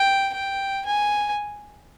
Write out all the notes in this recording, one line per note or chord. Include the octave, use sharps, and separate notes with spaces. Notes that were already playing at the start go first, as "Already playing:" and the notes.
Already playing: G5
G5
G#5